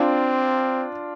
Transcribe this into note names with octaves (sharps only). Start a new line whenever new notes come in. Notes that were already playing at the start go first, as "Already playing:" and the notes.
Already playing: C4 D4 F4